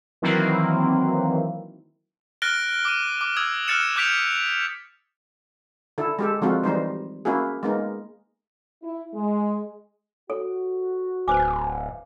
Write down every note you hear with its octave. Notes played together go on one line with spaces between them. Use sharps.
D#3 E3 F#3 A#3 C4 E4
F6 F#6 A6 A#6 D7 G7
D6 D#7
D6
D#6 E6 G#6
F6 F#6 A6 C#7 E7
D6 F#6 G6 B6 D7 F7
D3 E4 A4
G#3 G4 A4
D3 F3 G#3 C4 F4 F#4
E3 G3 D#4 C5
A#3 C#4 E4 F#4 G#4
G#3 A#3 B3 D#4
E4
G#3
F#4 A4 C#5
D1 B4 C5 G#5 D6